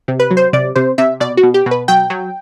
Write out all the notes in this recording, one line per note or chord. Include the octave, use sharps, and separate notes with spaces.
C3
B4
F#3
C5
C3 D5
C3 C5
C3 E5
B2 D5
F#4
B2
G4
B2
B4
F#3 G5
F#3